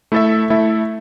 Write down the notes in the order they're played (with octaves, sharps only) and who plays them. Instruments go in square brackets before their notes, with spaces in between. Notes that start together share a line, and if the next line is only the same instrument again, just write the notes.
[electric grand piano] A3 E4 A4 E5
A3 E4 A4 E5